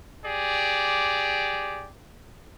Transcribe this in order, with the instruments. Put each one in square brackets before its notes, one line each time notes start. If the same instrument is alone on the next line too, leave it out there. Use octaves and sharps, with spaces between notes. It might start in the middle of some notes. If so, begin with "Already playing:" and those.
[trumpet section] G4 G#4 D5